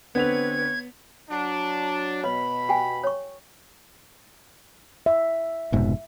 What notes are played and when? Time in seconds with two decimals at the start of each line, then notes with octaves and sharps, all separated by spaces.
0.15 D3 B3 C4 B4 C#5 G#6 F7
1.29 F#3 D4
2.24 B2 B4 C#5 D#5 B5
2.69 G4 G5 G#5
3.04 C#5 C#6
5.06 E5
5.72 F1 G#2 B2